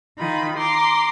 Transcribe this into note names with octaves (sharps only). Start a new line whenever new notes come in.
D#3 D#4 F4 B5
A#5 C6 D6